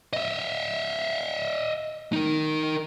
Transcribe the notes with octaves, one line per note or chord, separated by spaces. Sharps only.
D#5 E5
D#4 A#4